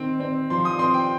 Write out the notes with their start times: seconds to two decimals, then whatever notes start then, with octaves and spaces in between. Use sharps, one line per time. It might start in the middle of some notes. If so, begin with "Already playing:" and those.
Already playing: D#3 C4
0.20 C4
0.50 F3 C6
0.65 D#6
0.79 C4 C6
0.94 G5